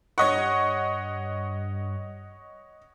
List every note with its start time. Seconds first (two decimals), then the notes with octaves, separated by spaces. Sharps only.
0.18 G2 C#5 D#5 F#5 C#6